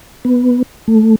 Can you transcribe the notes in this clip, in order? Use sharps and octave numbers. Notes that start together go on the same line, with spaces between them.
B3
A3